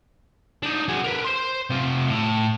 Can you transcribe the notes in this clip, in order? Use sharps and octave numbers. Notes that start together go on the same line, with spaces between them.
D4 D#4
F#3 G#4
A#4 B4
C5 C6
C3 F4
A2